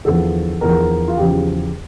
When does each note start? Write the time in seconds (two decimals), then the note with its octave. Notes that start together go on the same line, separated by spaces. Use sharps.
0.05 E2 D3 F3 A4
0.61 E2 D3 F3 A#4
1.08 F4
1.17 E2 C#3 F3 G4